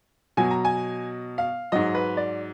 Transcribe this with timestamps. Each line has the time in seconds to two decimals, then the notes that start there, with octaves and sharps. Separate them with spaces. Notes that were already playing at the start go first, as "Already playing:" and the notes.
0.37 B2 F#3 G#5
0.51 A#5
0.65 G#5
1.38 F5
1.72 G#2 F#3 D#5
1.95 B4
2.17 D5